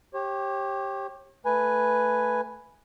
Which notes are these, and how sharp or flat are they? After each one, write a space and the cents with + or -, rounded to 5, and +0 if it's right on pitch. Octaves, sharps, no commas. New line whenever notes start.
G4 +0 C#5 -35
A3 +0 B4 +0 G#5 +0